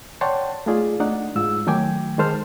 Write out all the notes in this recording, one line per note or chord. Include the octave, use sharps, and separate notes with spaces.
C#5 D5 F#5 G5 A5 C6
A3 D#4 F4 G#4 D5
A3 D4 D#4 D5 F#5
G#2 F4 E6
D#3 F#3 A3 G5 G#5 D6
D#3 G#3 A4 C5 A5 F6